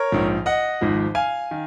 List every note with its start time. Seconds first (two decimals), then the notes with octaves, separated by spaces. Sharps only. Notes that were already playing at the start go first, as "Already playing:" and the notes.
Already playing: A#4 C#5
0.12 A#1 G#2 F3
0.46 D#5 F#5
0.81 G#1 G#2 F3
1.15 F5 G#5
1.51 D#3